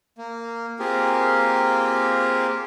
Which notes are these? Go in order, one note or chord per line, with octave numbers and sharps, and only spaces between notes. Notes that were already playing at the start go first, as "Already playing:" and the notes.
A#3
A#3 C4 F4 G4 G#4 A#4